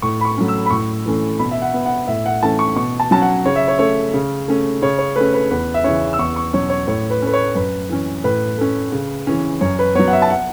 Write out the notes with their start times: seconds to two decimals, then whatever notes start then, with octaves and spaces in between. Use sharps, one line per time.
0.02 A2 C#6
0.21 B5
0.25 C#6
0.37 F#3 A3 C#4
0.48 E6
0.66 B5
0.71 A2 C#6
1.06 E3 A3 C#4
1.39 B2 B5
1.51 E5
1.62 F#5
1.74 B3
1.86 F#5
2.07 A2 E5
2.26 F#5
2.42 E3 A3 C#4 A5
2.59 C#6
2.76 B2 C#6
3.00 A5
3.11 F#3 C#4 A5
3.22 F#5
3.46 C#3 C#5
3.56 E5
3.68 C#5
3.79 A3 C#4 C#5
4.14 C#3
4.48 A3 C#4
4.82 C#3 C#5
4.98 C#5
5.16 A3 C#4 B4
5.34 B4
5.50 E2 B4
5.74 E5
5.84 C#3 E3 C#4 C#5
6.13 E6
6.18 E2 C#6
6.36 C#6
6.53 B2 F#3 C#4 C#5
6.70 C#5
6.87 A2 C#5
7.10 B4
7.22 A3 C#4 B4
7.33 C#5
7.55 F#2 B4
7.90 E3 C#4
8.24 A2 B4
8.58 A3 C#4
8.92 C#3
9.27 E3 C#4
9.61 F#2 C#5
9.79 B4
9.95 F#3 B3 C#5
10.08 F#5
10.13 E5
10.22 A5
10.30 F#5